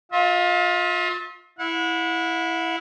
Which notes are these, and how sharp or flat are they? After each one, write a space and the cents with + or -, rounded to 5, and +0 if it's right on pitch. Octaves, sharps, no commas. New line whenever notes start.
F4 +25 E5 -35
E4 +0 F#5 -35